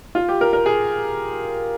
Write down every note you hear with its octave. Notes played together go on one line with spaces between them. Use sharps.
F4
G4
A#4
A#4
G#4